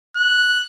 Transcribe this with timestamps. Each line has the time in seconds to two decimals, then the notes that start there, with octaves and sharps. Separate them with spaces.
0.16 F#6